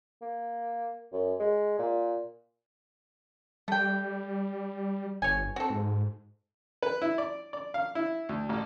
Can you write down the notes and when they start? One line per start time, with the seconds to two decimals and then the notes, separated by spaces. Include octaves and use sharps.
0.21 A#3
1.12 F#2
1.40 G#3
1.78 A#2
3.68 G3 A3 G5
5.22 G1 C#5 G#5
5.56 C4 F#4 A4
5.70 G#2
6.83 B4
7.02 E4
7.18 D5
7.53 D5
7.74 F5
7.95 E4
8.29 D2
8.49 A1